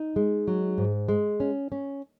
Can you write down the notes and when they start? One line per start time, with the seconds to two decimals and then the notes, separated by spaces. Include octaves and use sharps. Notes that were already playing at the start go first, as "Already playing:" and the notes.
Already playing: D#4
0.16 G#3
0.48 F#3
0.78 G#2
1.08 G#3
1.40 C#4
1.72 C#4